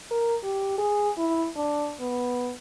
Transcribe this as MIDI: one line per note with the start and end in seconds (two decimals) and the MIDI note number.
0.11 0.35 70
0.43 0.73 67
0.78 1.10 68
1.18 1.49 64
1.56 1.95 62
2.00 2.53 59